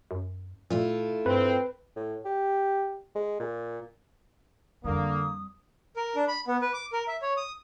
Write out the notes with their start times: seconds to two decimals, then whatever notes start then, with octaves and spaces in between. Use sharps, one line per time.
0.11 F#2
0.70 A#2 A3 E4 F4
1.26 G2 C4 B4
1.96 A2
2.25 G4
3.15 G#3
3.40 A#2
4.85 F2 D3 G3 A#3 D#6
5.96 A#4
6.16 D4
6.28 B5
6.47 B3
6.62 B4
6.74 D6
6.93 A#4
7.08 E5
7.22 C#5
7.37 D#6